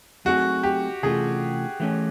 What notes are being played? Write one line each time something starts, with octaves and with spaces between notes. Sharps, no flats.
F#3 A3 C4 D#4 F#4 G#4
G4
C3 E3 A3 C#4 F4 G#4
E3 A3 C#4